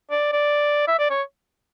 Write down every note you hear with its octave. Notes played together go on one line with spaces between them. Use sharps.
D5
D5
E5
D5
C#5